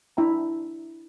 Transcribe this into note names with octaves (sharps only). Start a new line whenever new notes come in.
D4 E4 E5 G5 A#5